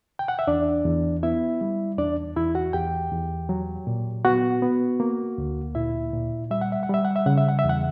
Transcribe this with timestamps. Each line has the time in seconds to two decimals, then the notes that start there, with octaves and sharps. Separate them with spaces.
0.19 G5
0.28 F#5
0.39 E5
0.47 E2 D4 D5
0.85 E2
1.23 B3 E4 E5
1.61 G3
1.98 E2 D4 D5
2.36 E2 E4 E5
2.55 F#4 F#5
2.73 E2 G4 G5
3.12 E2
3.49 F#3
3.87 A#2
4.25 B3 F#4 F#5
4.62 B3
5.00 A#3
5.38 D2
5.75 A#2 E4 E5
6.13 A#2
6.51 G3 E5
6.61 F#5
6.72 E5
6.83 F#5
6.89 G3 E5
7.05 F#5
7.16 E5
7.26 C#3 F#5
7.38 E5
7.49 F#5
7.59 E5
7.64 E2
7.69 F#5